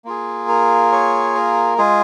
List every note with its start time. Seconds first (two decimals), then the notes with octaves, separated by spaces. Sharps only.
0.05 A#3 F4 G#4
0.49 A#4
0.92 C#5
1.35 A#4
1.78 G#3 F4 G#4